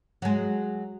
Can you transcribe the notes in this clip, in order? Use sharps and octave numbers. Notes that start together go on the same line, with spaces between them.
F#3 G#3